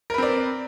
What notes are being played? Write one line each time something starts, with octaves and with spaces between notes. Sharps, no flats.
C4 A#4 B4 D5